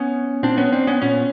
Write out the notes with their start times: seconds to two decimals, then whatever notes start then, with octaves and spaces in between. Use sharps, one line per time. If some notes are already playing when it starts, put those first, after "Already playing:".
Already playing: B3 C#4
0.43 A#2 C4 D4
0.57 B3 C#4
0.73 C4 D4
0.87 B3 C#4
1.02 A#2 B3 C#4